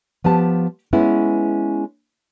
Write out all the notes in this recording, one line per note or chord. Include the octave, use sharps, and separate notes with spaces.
F3 B3 G4 A5
G#3 B3 C#4 E4